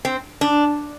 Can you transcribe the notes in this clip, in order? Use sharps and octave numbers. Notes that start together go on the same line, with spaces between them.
C4
D4